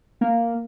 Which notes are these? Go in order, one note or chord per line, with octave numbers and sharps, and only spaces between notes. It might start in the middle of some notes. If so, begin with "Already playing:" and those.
A#3